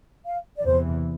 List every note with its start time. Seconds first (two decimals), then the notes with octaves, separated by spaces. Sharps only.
0.25 F5
0.57 D5
0.65 E2 C3 E3 C5